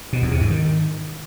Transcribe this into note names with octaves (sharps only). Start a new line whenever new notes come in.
B2
E2
C3
G#2
D#3